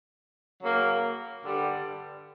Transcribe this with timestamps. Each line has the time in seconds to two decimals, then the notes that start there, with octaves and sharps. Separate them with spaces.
0.62 C#3 F#3 A#3
1.43 G2 D3 G3